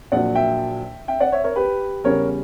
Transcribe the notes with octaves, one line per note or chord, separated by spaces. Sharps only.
A#1 A#2 F#3 D5 F#5
E5 G5
E5 G5
D5 F#5
C#5 E5
A#4 C#5
G4 B4
E2 C#3 G3 C#4 A#4 C#5